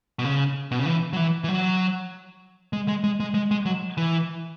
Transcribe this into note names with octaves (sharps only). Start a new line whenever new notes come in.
B2
C#3
B2
C#3
E3
F#3
E3
E3
F#3
G#3
G#3
G#3
G#3
G#3
G#3
F#3
E3